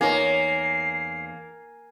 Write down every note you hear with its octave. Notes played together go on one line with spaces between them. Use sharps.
E2 A#3 D#4 C#5 G#5 C7